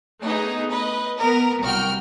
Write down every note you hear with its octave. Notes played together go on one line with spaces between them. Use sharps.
A3 B3 D#4 G#4
B4 D#5
B3 A#4
C2 F#4 G5 F6